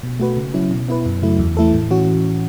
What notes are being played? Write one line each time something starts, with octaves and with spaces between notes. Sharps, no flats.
B2
A3 F#4 B4
C#3
F#3 C#4 E4
B2
B3 E4 B4
F#2
C#3 F#3 A3 E4
E2
E3 A3 E4 A4
A2
E3 C#4 F#4